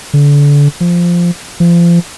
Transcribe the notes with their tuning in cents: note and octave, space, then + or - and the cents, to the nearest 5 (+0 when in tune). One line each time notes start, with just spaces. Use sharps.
D3 -30
F3 -5
F3 -30